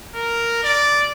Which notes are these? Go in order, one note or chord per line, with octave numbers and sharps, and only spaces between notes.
A#4
D5